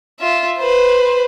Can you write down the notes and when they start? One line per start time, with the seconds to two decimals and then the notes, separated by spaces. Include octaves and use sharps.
0.20 F4 E5
0.59 B4 C5